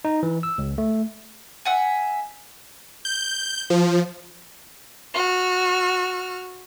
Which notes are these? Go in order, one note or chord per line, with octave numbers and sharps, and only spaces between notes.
D#4
E3
E6
C#2
A3
E5 F#5 G#5
G6
F3
F#4 F6